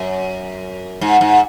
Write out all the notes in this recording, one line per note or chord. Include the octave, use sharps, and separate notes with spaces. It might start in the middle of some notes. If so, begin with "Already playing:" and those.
Already playing: F#2
G#2
G#2